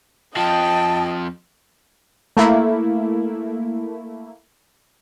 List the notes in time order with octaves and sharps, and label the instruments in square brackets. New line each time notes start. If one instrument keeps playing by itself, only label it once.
[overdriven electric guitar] F2 F3 [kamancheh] D#5 G5 [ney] A5
[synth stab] A3 A#3 E4